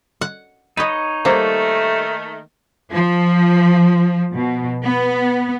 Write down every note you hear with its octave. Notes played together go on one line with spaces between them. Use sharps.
F#5
D#4 B4 C#5 D#5
D#3 G3 A3 A#3 A4 C5
F3
B2
B3